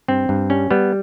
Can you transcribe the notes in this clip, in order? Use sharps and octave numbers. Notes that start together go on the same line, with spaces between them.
G2 C4
G2
G3 C#4
G3 B3